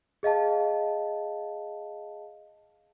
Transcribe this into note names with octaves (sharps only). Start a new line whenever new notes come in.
G#4 D#5 F5 A5